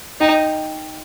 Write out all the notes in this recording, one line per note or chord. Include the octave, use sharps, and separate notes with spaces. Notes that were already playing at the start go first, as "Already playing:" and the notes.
D#4 G5